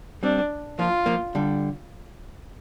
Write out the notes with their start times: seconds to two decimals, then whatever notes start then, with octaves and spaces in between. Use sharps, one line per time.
0.23 G3 C4 D4
0.78 F3 A#3 F4
1.06 F3 A#3
1.35 D3 G3